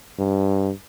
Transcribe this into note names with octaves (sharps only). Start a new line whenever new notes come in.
G2